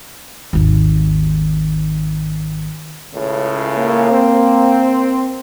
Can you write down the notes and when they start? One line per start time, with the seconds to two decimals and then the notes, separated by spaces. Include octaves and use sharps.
0.53 G#1 D#2
3.13 C#2 A2 C#3
3.77 A#3
4.10 C4